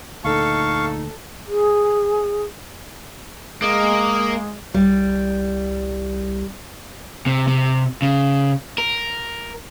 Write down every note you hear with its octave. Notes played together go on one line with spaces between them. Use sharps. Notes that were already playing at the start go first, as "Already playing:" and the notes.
D2 A#2 D#4 A4 F5 C#6
G#4
G#3 A#3 D#6
C2 G3
C3
C3
C#3
A#4